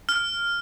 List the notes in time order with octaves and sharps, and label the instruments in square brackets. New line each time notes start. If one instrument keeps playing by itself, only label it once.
[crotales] F6